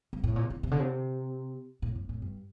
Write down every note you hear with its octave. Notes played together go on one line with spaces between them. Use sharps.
G2
A2
A#2
D3
C3
D3
C3
A2
G2
A2
G2